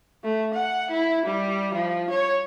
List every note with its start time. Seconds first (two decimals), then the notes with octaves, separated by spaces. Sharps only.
0.24 A3
0.54 F#5
0.91 E4
1.26 G3
1.74 F3
2.10 C#5